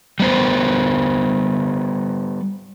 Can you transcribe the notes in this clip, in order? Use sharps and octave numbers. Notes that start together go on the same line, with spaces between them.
G3 B3 C5